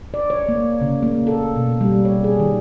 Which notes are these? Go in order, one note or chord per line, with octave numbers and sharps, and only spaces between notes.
D5
C#5
A#3
C#3
A#3
A4
B2
G3
C#5
G#4
D#3